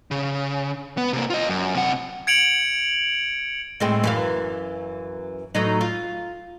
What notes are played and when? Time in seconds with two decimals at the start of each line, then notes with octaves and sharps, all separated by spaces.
0.11 C#3
0.97 B3
1.13 C3 A#3
1.30 F4 D#5
1.49 F#2
1.75 C3 F#5
2.27 G#6 C#7 D7 F7 F#7
3.80 A2 G#3 C4
4.04 F#2 E3 F5
5.55 A2 F#3 D#4
5.81 F4